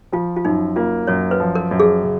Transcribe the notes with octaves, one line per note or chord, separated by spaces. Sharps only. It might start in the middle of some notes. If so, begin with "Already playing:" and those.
F3 F4
F4
F#2 D#4
A#3 F4
F#2 C#5
B4
F3
A#4
F#2
G#4
C#3